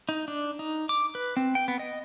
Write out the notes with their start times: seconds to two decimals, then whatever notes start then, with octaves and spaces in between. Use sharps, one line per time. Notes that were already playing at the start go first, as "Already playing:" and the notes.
0.09 D#4
0.28 D4
0.59 D#4
0.89 D6
1.15 B4
1.37 C4
1.55 G5
1.68 B3
1.79 D#5